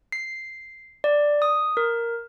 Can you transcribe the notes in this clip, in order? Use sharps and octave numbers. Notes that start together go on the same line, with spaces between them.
C7
D5
D#6
A#4